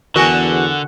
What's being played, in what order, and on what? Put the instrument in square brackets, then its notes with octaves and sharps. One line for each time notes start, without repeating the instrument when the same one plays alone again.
[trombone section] E2 [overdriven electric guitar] D3 [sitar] F#4 [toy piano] A#4 G#5 A5